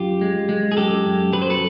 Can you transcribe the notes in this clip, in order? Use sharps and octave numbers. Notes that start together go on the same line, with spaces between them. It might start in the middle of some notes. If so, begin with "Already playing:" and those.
Already playing: F#2 F4 G4
G#3
G#3
G#4
F#2 G4 A4
F#2
F#3 B4
C5
A4 B4